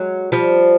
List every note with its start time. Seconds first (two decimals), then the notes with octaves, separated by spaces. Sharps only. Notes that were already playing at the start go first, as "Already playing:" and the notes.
Already playing: F#3 G#3
0.32 F3 G3